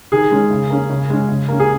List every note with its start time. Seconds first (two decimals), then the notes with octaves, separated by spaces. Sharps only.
0.12 D#3 G#4
0.31 G#3 C#4
0.51 C#3
0.70 A#3 C#4
0.90 C#3
1.10 G#3 C#4
1.29 C#3
1.48 A#3 C#4
1.60 G#4